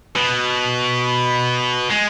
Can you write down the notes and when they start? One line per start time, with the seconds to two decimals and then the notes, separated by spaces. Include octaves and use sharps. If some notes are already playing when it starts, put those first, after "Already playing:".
0.16 B2
1.91 G#3